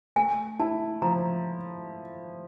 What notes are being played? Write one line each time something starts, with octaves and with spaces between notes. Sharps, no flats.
A3 G#5
E4 A5
F3 A#5